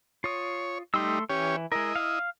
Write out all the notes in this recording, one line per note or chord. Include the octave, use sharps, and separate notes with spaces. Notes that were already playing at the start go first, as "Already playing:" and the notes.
F4 C#5 D#6
G3 A3 D#4 C6 E6
E3 C#4 G4 C#5
G#3 E4 A#4 D#5
F5 F6